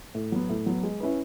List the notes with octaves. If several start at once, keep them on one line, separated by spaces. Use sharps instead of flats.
A2
F#3 B3
A2
F#3 B3
G#3
C#4 E4 B4